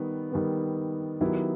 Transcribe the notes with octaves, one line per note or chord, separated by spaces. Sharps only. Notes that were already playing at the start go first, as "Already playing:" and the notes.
Already playing: D#3 G3 B3
D#3 G3 B3
D#3 F#3 B3 E4 G4